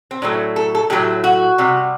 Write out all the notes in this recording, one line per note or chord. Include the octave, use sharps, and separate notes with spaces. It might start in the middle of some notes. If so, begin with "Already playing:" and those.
C4
A2 F#3 A3 D4
A4
A4
A2 F#3 A3 G4
F#4
C3 G3